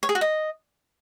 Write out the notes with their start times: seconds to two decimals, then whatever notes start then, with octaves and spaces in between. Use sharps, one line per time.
0.03 C#5
0.09 G#4
0.15 F#4
0.21 D#5